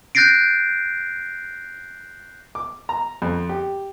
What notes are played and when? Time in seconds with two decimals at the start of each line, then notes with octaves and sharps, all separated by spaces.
0.15 F#6 G6 A6 A#6 C7 D7
2.55 D6
2.89 A#5
3.22 F2
3.49 G4